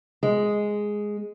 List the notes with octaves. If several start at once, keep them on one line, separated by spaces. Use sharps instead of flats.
G#3